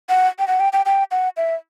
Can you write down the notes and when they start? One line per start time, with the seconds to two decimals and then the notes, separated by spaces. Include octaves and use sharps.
0.09 F#5
0.39 G5
0.48 F#5
0.60 G5
0.73 G5
0.86 G5
1.11 F#5
1.37 E5